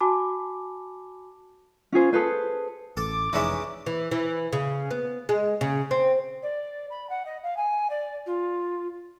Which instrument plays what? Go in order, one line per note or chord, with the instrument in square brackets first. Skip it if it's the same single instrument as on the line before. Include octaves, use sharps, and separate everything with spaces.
[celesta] F#4 G#5 A5 B5 D6
[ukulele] C#4 F4 G#4 C5
G#4 A4 B4 C5
[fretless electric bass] A1 [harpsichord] A4 [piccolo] D6
[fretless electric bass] F1 [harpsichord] E3 G#3 C#4 [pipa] D#4 D5 E5
[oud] E3
E3
C#3
B3
G#3
C#3
C4
[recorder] D5
B5
F#5
D#5
F5
G#5
D5
F4